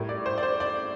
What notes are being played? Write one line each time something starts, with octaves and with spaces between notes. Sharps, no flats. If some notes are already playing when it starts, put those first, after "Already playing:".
Already playing: A2 G3 A#4
D5
C5
D5
C5
D5